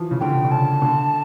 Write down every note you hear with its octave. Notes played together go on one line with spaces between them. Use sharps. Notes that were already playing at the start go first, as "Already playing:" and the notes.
Already playing: E3 F3
C#3
D3 G5
D3
C#3 A5
D3